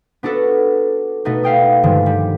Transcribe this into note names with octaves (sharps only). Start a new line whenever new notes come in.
B3 D4 F#4 A4 B4
B2 A3 B3 D#4
E5 F5 G5 D#6
G2 D3 D#3 F3 G#3
G3